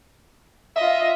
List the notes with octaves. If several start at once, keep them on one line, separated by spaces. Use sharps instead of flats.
F4 D#5 E5